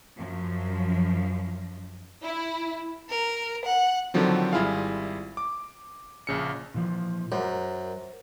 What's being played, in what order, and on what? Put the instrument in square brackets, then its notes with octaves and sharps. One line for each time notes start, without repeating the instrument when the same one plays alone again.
[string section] F#2 F3
[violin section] E4
[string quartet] A#4
F#5
[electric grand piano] D3 D#3 F3 F#3 C4
G#1 G3 E4 F4 G#4 F5
D6
A#1 C#3 C#7
[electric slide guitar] A#2 E3 F3
[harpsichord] F#2 [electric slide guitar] A#4 C5